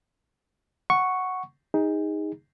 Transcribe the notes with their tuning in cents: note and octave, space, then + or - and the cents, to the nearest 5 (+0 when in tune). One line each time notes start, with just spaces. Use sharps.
F#5 +0 C#6 +0
D#4 +10 G#4 -30